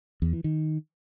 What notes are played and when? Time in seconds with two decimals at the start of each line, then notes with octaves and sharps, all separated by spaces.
0.22 E2
0.33 E3
0.44 D#3